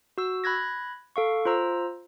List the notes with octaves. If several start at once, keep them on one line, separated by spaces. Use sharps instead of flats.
F#4 E6
B5 F#6 G#6 A#6
A4 F5 C#6
F4 C5 A#5 E6